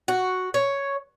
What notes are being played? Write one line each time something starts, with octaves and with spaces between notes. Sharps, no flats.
F#4
C#5